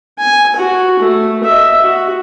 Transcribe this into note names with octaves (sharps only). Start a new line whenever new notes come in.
G#5
F#4
A3
D#5 E5
F#4